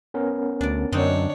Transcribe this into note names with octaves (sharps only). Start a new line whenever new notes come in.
B3 C#4 A#4
D2 D4 D5
F#2 D3 C4 D4 D#4 C#5